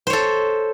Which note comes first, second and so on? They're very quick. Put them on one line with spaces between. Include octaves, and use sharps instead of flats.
C5 C#5 A4